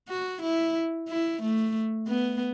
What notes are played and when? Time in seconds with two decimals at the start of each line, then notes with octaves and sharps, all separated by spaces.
0.09 F#4
0.42 E4
1.09 E4
1.42 A3
2.08 B3